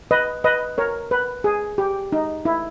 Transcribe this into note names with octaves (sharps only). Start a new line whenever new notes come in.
B4 D#5
B4 D#5
A#4 C#5
B4
G#4
G4
D#4
E4